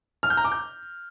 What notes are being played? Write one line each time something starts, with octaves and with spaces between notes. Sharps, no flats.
F6
G6
A#5
D6
G6